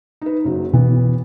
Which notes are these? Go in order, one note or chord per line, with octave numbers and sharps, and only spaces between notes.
D#4 B4
F#1 F#3
B2 E3 B3